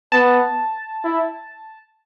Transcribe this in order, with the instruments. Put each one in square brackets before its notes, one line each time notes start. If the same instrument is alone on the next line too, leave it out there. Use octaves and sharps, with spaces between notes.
[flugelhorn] B3 [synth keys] A5
[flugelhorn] E4